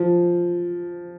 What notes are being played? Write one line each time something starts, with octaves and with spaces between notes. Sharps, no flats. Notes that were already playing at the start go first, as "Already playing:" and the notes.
Already playing: F3